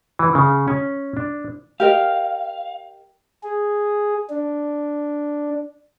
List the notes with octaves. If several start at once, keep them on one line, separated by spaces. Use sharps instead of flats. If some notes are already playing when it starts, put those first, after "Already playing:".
E3
C#3
C#4
D4
G4 A#4 D#5 F5
G#4
D4